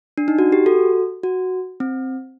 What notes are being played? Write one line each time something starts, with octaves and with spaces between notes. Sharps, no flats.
D4
D#4
F#4
G4
F#4 A4
F#4
C4